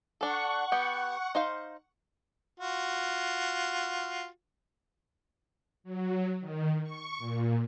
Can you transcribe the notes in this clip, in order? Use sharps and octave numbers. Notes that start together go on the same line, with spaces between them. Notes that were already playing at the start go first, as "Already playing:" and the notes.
D4 A4 F#5 C#6
B3 G4
D#4 C5 F5
F4 F#4
F#3
D#3
C#6
A#2